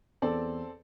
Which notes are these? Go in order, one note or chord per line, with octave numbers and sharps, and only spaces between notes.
E2 C4 A4 D5